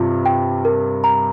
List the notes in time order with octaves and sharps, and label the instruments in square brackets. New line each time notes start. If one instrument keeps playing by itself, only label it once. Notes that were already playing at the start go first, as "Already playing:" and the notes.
Already playing: [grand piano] G2 C3 [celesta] F4
[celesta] G5
A#4
A#5